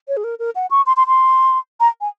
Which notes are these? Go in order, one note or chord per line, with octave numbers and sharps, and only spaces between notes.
C#5
G#4
A#4
A#4
F#5
C#6
C6
C6
C6
A#5
G#5